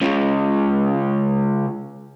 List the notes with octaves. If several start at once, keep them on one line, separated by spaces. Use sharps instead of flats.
C#3 G#3